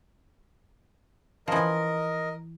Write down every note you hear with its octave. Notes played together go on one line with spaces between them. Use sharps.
E3 F3 A#4 D#5